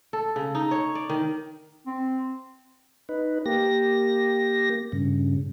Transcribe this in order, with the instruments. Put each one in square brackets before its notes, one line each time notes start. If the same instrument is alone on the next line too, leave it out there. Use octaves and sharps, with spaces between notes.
[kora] A4
C#3
D#4
C#5
D5
D#3
[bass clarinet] C4
[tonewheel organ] D#4 B4
A#3 G4 A#6
G2 C#3